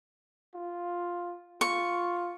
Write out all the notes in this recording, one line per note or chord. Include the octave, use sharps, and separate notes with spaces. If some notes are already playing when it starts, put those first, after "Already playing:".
F4
F4 C#6